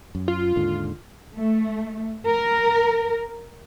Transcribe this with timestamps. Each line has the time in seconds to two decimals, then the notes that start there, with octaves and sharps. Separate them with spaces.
0.15 F#2
0.28 F4
0.56 D#2 G#2 D3
1.35 A3
2.27 A#4